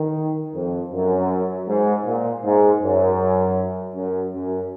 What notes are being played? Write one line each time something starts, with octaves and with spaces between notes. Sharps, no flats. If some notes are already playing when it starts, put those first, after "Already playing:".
Already playing: D#3
F2
F#2
G#2
A#2
G#2
F#2
F#2
F#2